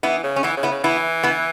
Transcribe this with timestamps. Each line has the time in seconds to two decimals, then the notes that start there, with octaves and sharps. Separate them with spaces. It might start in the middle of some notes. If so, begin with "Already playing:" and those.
0.03 E3 B3 E4
0.23 C#3
0.36 C#4
0.43 E3 B3 E4
0.57 C#3
0.63 B3 E4
0.71 C#3
0.83 E3 B3 E4
1.23 B3 E4